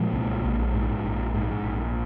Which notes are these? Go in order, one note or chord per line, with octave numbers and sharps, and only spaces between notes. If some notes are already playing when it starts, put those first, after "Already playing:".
Already playing: A#2 F3 G#3
C2
A#1
G#2
A#1
G#2
A#1